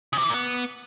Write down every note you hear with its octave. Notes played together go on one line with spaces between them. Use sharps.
C#3
C3
E3
A#2
B3